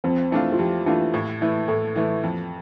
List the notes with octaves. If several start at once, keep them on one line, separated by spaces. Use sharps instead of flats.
F2 C4
E3 A3 D4 F4
F4
F2 G4
E3 A3 D4 F4
A2
E3 A3 E4 B4
A2 A4
E3 A3 E4 B4
F2